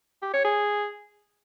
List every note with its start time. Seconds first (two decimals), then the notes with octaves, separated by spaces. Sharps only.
0.22 G4
0.33 C#5
0.45 G#4